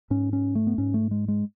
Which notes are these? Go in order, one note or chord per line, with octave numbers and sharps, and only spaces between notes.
G#2 C#4
C#4
A3
B3
G#2 C#4
A3
G#3
G#3